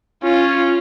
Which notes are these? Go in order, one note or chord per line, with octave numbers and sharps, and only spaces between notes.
C#4 F4